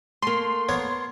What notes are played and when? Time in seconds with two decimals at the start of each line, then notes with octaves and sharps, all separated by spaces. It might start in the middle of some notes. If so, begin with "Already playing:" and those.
0.22 A3 A#3 C6
0.69 B3 A#4 C#5